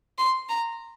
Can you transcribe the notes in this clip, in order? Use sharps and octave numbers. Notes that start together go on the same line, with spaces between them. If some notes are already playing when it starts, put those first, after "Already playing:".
C6
A#5